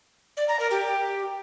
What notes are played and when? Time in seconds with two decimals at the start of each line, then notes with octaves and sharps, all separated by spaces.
0.37 D5
0.48 A#5
0.59 A#4
0.71 G4